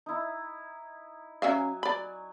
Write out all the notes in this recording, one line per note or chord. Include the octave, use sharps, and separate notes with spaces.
D#4 E4
F#3 C#4 E5 F5 G#5
D5 B5